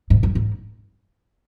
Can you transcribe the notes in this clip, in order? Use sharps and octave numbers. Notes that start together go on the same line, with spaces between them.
G#2
F#2
G#2